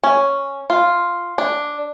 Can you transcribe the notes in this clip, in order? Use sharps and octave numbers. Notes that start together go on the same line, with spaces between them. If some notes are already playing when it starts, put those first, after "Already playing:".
C#4
F4
D4